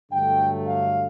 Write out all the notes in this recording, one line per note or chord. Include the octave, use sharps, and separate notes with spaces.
G2 D3 F#3 A3 G5
F5